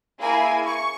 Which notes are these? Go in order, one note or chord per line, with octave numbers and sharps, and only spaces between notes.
A#3 E4 G#4 G#5
C#6